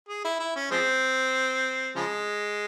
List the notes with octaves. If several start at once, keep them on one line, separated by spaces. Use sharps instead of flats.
G#4
E4
E4
C#4
F3 G#3 C4
C#3 F3 G#3